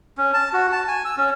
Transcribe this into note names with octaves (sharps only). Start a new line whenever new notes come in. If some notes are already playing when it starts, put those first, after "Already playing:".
C#4
A5
F#4
A5
G#5
E6
C#4